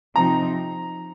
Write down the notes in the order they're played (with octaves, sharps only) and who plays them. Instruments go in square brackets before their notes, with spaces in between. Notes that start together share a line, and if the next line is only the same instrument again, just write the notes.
[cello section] C3 F3 C4 D#4 [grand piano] A#5